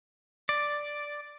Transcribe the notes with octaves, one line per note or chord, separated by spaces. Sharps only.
D5